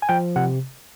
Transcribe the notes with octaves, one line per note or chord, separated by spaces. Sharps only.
G#5
F3 G5
C3 F#5